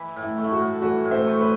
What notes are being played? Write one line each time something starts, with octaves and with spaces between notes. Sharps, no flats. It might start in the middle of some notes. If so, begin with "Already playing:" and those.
Already playing: E3
A2
E4
A3
E4
F#4
A2
E3 F#4
A2
C5 E5
A3
B4